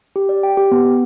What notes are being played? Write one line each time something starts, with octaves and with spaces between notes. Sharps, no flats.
G4
D5
G5
G4
B3
B3